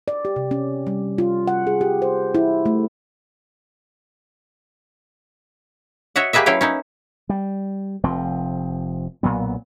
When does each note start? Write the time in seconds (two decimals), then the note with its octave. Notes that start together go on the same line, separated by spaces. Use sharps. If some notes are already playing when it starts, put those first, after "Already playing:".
0.08 D5
0.25 G4
0.36 C3
0.51 C#4
0.87 G3
1.18 F4
1.47 F#5
1.67 G#4
1.81 G4
2.02 C5
2.35 E4
2.66 A3
6.16 F#4 C#5 D#5 E5 F#5
6.33 A#3 G4 G#4 B4 D#5 E5
6.46 F#3 C#4 E4 F5 G5
6.61 C#4 D#4 E4
7.29 G3
8.04 F1 F3 C4
9.23 B1 A#2 F#3 B3